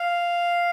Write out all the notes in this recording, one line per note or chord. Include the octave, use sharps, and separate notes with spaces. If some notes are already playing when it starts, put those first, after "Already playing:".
Already playing: F5